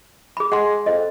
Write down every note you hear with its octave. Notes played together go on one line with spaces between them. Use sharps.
G#4 B5
G#3 F#5 C6
F2 D#5